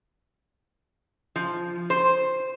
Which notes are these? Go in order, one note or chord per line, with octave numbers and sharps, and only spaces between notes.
F3
C5